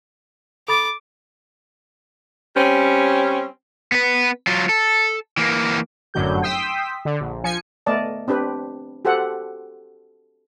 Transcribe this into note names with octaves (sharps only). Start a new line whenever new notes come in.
A4 B5 D6 A6
G3 C4 C#4
B3 B4
F#3 F4
A4
E3 A#3
G1 F#2 A2 D3 F#3 G6
G5 C6 D#6 E6 B6
D3
A#1
F3 G#5 C#7
A3 B3 A#4 D5 D#5 A5
C4 D4 G4 B4
F#4 G4 A4 C5 F#5